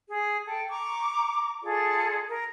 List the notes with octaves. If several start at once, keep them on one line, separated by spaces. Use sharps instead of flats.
G#4
A4 G5
A#5 C#6 D6
F4 G#4 A4 D5
A#4